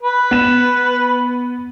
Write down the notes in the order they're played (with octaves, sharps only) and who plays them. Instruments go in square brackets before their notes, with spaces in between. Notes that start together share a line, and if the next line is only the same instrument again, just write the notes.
[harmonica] B4
[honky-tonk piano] B3 E7